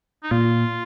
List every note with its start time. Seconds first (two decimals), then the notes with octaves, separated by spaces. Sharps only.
0.23 D#4
0.31 A#2 F4